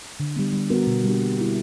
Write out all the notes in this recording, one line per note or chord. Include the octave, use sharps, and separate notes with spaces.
D3
G3 B3
G3
B3 F#4 A#4
B2
G3 A#3 D4 G4
G3
A#3 E4